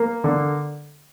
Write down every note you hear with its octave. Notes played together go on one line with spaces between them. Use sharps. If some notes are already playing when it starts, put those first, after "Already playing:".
Already playing: A#3
D3